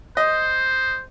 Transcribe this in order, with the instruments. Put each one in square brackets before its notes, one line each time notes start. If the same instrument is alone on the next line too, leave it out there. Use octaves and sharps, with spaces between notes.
[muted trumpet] C5 [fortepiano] D#5